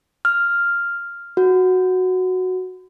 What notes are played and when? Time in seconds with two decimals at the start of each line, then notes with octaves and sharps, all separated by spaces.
0.25 F6
1.37 F#4